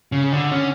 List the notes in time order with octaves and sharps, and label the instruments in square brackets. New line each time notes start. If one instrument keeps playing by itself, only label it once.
[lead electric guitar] C#3
D3
C#4